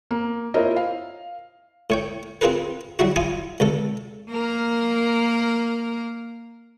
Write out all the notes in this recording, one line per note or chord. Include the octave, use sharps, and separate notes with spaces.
A#3
E4 F4 A#4 C5 C#5 D#5
F5
A2 C#5 G5
C4 F4 G#4 A#4 B4
F#3 G3 E4 F#4
E4 F4 G#5 D#6
C#2 C3 A4
A#3 A#4